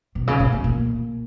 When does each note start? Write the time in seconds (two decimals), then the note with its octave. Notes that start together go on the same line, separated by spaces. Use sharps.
0.15 B2
0.27 C#3
0.40 B2
0.52 B2
0.64 A#2